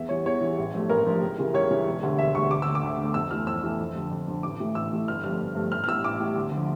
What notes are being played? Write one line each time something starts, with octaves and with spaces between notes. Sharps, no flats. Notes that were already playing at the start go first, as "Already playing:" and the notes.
Already playing: E2 E5
E3 G3 C#5
E2 C#5
E3 G3
A1
G2 F3 A3
A1 A#4
G2 F3 A3
C#2
C#3 E3 G3
C#2 C#5
C#3 E3 G3
E1
D2 D3 G3
E1 E5
D2 D3 G3 C#6
D2 D6
D3 A3 E6
D6
D2
D3 A3
F2 E6
E3 A3 F6
F2 E6
E3 A3
F2
D3 F3
F2
D3 F3
A1 D6
A2 E3 A3
A1 E6
A2 E3 A3
G1 F6
G2 F3 A3 F6
G1
G2 F3 A3
A1 F6
F6
A2 G3 E6
A1 D6
A2 G3
D2
D3
F3